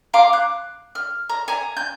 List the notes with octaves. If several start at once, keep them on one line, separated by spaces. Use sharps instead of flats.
F5 A#5 C6 D6
F#6
F6
A#5
G#5 A#5
G6